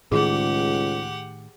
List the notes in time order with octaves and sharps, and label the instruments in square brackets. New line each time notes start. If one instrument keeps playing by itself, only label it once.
[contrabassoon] C#2 [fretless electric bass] A2 D#3 [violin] G4 F#5 [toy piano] G#4